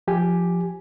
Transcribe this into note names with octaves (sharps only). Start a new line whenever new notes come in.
F3 G4 G#5